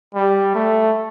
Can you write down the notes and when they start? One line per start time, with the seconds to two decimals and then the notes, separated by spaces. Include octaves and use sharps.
0.15 G3
0.55 A3